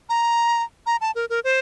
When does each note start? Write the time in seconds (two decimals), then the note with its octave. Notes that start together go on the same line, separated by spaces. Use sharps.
0.09 A#5
0.86 A#5
1.01 A5
1.15 A#4
1.30 A#4
1.44 C5